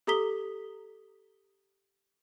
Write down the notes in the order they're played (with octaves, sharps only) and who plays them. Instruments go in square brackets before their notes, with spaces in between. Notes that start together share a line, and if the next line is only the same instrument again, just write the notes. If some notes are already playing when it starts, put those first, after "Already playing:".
[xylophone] G4 A4 A#5 D#6 B6 G7